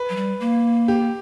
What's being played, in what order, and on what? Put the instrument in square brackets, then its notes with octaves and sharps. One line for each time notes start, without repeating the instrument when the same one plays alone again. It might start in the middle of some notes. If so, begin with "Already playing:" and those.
Already playing: [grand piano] B4
[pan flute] F#3
G3
A#3
[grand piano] G4